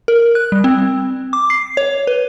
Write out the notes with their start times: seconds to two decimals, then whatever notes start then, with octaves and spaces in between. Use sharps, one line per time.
0.08 A#4
0.35 F#6
0.52 G3
0.64 C4
1.33 D6
1.50 C7
1.77 C#5
2.07 B4